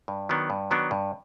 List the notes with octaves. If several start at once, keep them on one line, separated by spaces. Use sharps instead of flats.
G2
D#3 F#3 B3 D4
G2
D#3 F#3 B3 D4
G2